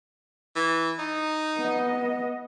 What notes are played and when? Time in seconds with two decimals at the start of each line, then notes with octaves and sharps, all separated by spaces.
0.56 E3
0.99 D#4
1.58 B3 D#5